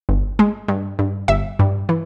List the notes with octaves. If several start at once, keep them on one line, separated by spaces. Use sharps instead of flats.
G1
G#3
G2
G2
G1 E5
G2
E3